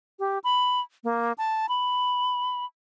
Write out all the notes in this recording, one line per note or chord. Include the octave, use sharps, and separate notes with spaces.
G4
B5
A#3
A5
B5